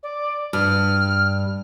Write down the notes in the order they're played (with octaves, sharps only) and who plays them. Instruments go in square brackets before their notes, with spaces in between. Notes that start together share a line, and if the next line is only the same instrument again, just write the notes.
[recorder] D5
[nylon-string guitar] G2 [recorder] F6